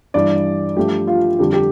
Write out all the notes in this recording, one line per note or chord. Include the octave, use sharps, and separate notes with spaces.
G2 E3 G3 D5
G2 F3 A3 G4
F4
F2 D3 G3 G4
G4